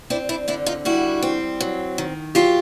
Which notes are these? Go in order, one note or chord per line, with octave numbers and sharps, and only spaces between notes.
C4 D4 E4
D4 E4
D3 D4 E4
D#4 F4
G3 E4 F#4
C4
F#3
D#3
F#3 F4 G4